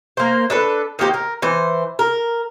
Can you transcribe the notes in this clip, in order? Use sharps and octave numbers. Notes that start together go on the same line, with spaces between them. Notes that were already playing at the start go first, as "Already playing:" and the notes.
A#3 C5
D4 A4 B4
D#3 A#3 G4 C5
A#4
E3 C5
A#4